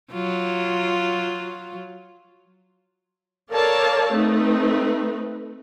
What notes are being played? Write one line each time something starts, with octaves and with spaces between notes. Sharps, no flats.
F#3 F4
A4 A#4 C#5 D5 F5 A5
A3 C4 D#4 B4